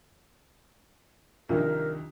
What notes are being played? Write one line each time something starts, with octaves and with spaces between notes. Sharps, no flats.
C2 D#3 F3 D4 F4 A#4